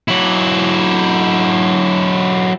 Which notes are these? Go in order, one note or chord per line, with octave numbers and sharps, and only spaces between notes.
F#3 E4